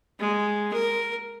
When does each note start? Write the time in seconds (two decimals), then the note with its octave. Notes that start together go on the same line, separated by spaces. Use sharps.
0.19 G#3
0.73 A#4